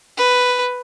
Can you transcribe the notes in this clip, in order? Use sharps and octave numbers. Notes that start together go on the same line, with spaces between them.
B4